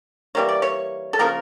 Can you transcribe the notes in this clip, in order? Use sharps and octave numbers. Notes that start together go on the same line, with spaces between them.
E3 G3 A#3 C#5
D5
C#5
A4
C#3 F3 A#3 A#4